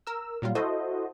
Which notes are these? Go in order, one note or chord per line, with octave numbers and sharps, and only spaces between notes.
A#4 E6
A#2 F#3 G3 F4
E4 F#4 A4 C5 D#5